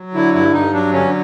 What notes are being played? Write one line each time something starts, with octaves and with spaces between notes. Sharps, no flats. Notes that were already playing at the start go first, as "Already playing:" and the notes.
Already playing: F#3
D3 E4
G2 E4
G2 D#4
F#3 D4
D3 C#4